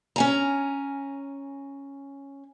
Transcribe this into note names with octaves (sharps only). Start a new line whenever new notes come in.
C#4 G#5 A#5